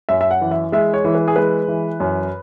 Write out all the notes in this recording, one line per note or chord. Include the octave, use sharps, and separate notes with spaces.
F#2 E5
E5
F#5
E3
E5
G#3 E5
C#5
E3
B4
G#4
G#3 B4
E3
F#2